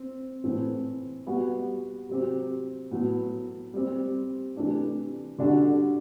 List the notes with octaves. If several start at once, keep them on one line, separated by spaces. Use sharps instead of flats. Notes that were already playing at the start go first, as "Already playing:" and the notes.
Already playing: C4
A2 E3 A3 C4
G3 B3 F#4
C3 F#3 C4 G4
A2 F#3 B3
G3 C4 G4
C3 E3 A3 D4 G4
D3 G3 D4 F#4 A4